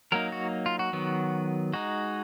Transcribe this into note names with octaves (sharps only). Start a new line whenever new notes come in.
F#3 A#3 D#4 A#4
F#4
F4
F#4
D#3 F#3 B3
G#3 D#4 F#4